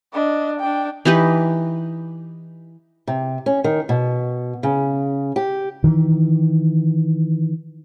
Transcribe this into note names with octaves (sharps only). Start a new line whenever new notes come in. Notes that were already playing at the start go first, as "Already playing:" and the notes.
D4 D#5
D4 G5
E3 D#4 G4 B4
C3
C#4
D#3
B2
C#3
G4
D#3 E3